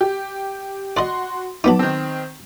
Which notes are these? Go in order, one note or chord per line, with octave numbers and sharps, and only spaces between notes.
G4
F#4 D5 D#5 C6
F#3 B3 D#4 A5 D6
D#3 C4